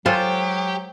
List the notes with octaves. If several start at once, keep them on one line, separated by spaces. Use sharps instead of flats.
F#3 G#3 F4 G4 A4 C5